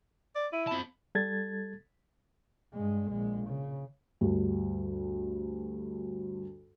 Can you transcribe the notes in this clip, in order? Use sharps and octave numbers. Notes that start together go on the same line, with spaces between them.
D5
E4 D#7
C4 A5 B5
G3 A4 G#6 A6
G2 G#3
A#1 G#3
C#3
D2 G2